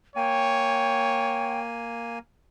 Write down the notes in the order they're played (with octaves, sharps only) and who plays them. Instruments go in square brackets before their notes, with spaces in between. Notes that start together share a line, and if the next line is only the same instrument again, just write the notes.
[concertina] A#3 G#5 [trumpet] C#5 [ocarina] G5